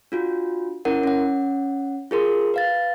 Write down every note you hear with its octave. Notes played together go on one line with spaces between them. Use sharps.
D4 F4 F#4
C#4 E4 A#4 F#5
C#4 F#5
F4 G#4 A#4 C6
B4 F5 A6